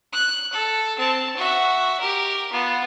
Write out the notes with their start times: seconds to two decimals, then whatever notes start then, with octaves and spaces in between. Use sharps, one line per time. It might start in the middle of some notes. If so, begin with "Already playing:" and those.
0.13 F#6
0.53 A4
0.99 C4 A5
1.36 F#4 E5
2.00 G4 A#4
2.52 B3 F4